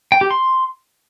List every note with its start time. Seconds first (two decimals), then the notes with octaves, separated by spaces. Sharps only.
0.12 G5
0.21 G4
0.31 C6